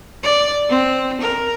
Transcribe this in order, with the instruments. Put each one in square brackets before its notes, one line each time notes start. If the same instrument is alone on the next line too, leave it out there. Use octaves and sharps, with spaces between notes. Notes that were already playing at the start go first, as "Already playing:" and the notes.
[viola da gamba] D5
C4
A#4